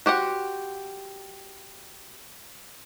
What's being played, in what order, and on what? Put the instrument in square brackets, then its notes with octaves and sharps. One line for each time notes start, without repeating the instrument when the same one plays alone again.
[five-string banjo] F#4 G4 C5 F#5